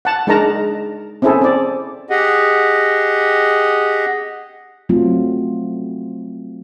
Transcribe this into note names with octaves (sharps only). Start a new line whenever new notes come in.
F#5 A5
G#3 D4 D#4 A#4 A5 A#5
C4 C#4 E4 G#4 A4
C4 D5
G4 G#4 D#5 F#5
F#3 A3 C4 F4